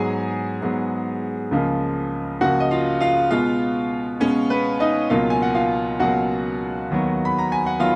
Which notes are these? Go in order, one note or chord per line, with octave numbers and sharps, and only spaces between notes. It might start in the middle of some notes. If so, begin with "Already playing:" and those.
Already playing: G#2 F#3 B3 G#4 G#5
G#2 F#3 B3
C#2 C#3 F3 A#3
C#2 C#3 F3 A#3 F#4 F#5
D#5
F4 F5
F4 F5
B2 G#3 B3 F4 F5
B2 G#3 B3 C#4 C#5
B3 B4
D#4 D#5
C#2 B2 F#3 A#3 F4 F5
G#5
F#5
F4 F5
C#2 B2 F#3 A#3 F#4 F#5
D#2 D#3 F#3 B3
B5
A#5
G#5
F#5
D#3 F#3 B3 F4 F5